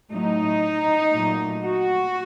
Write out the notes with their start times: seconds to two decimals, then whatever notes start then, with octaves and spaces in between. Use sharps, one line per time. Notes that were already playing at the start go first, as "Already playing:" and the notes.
0.11 A2 F#3 A3 D#4
1.13 A#2 F#3 A3
1.64 F#4